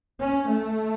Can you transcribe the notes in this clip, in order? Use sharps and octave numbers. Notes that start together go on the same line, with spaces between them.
C#4
A3